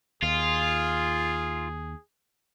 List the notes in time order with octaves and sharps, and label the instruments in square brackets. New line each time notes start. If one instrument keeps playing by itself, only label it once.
[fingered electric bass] D#2 [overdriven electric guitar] F4 [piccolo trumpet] G#4